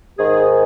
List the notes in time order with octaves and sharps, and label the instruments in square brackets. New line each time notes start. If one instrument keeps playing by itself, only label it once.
[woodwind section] G#2 D#3 G#4